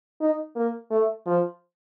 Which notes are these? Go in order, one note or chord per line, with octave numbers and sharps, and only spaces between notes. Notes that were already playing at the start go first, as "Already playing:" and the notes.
D#4
A#3
A3
F3